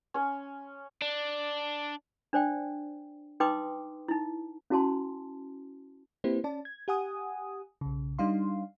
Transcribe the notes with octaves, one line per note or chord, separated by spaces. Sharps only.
C#4 C#5
D4
D4 C5 D5 G5
D#4 B4 G5 C6 D6 D#6
D#4 E4
C#4 E4 F#4 G#5 A5 C6
A#3 C4 E4 G4 B4 C5
C#4 D5 A5
G#6
G4 F#5 G#5 D#6
B1 C#3
G3 D4 D#4 F5 C6